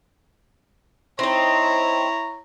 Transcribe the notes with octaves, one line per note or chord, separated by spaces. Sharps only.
C4 D#4 E4 C#5 A#5